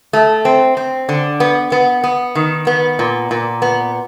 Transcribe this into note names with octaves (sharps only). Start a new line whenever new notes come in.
A3
C4
C4
D3
B3
B3
B3
D#3
B3
A#2
A#2
B3